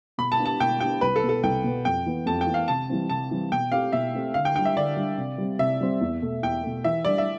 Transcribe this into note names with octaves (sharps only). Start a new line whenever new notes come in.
B2 B5
A5
B3 D4 G4
A5
B2 G5
B3 D4 G4 G5
C2 B4
A4
B2 B3
A4
C2 G5
B2 B3
F2 G5
E3 B3
F2 A5
G5
E3 B3
F5
C3 A5
E3 G3 C4
C3 A5
E3 G3 C4
B2 G5
A3 C4 G4 F5
B2 E5
A3 C4 G4
D3 F5
G5
G3 D4 G5
E5
D3 D5
G3 D4
C3
G3 C4
C3 E5
G3 C4
E2
B2 A3
E2 G5
B2 A3
E3 E5
G3 D4 D5
E5